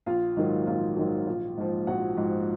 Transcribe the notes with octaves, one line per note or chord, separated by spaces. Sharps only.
A#1 F4 F5
G#2 D#3 F#3
A#1 F4 F5
G#2 D#3 F#3
A#1
G#2 F3
A#1 F#4 F#5
G#2 F3